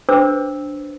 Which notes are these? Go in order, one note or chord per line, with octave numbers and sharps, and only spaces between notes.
D4 B4 C5 D6 E6